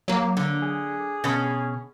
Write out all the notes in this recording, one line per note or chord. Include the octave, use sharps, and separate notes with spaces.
F#3 A#3
D3
G#4
B2 C#4